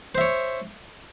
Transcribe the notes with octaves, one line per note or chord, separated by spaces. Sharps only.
C5 C#5 E5